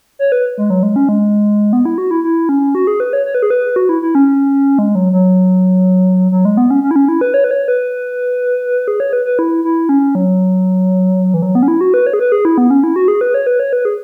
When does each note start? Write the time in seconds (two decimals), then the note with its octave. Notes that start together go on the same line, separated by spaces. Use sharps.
0.19 C#5
0.32 B4
0.58 G#3
0.70 F#3
0.83 G#3
0.96 C#4
1.09 G#3
1.73 B3
1.85 E4
1.98 F#4
2.11 E4
2.24 E4
2.49 C#4
2.75 F#4
2.87 G#4
3.00 B4
3.13 C#5
3.26 C#5
3.34 B4
3.42 G#4
3.51 B4
3.76 F#4
3.89 E4
4.02 E4
4.15 C#4
4.79 G#3
4.95 F#3
5.13 F#3
6.32 F#3
6.45 G#3
6.57 B3
6.71 C#4
6.83 C#4
6.91 E4
6.96 C#4
7.09 E4
7.21 B4
7.34 C#5
7.44 B4
7.51 C#5
7.68 B4
8.88 G#4
9.00 C#5
9.13 B4
9.25 B4
9.39 E4
9.64 E4
9.89 C#4
10.15 F#3
11.34 E3
11.42 F#3
11.55 B3
11.63 C#4
11.68 E4
11.81 F#4
11.94 B4
12.07 C#5
12.13 G#4
12.19 B4
12.32 G#4
12.45 E4
12.58 B3
12.70 C#4
12.84 E4
12.96 F#4
13.08 G#4
13.21 B4
13.34 C#5
13.47 B4
13.60 C#5
13.73 B4
13.85 G#4